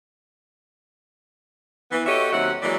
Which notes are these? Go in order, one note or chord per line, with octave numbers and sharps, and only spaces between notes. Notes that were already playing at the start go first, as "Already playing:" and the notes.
E3 B3
F#4 G4 A4 C#5 D#5 E5
D#2 F#3 C4 E5 F#5
E3 F#3 G#3 A#3 D5